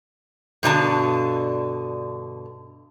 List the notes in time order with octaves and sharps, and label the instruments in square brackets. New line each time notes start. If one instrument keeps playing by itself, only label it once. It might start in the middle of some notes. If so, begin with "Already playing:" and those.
[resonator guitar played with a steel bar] G2 B2 D3 A5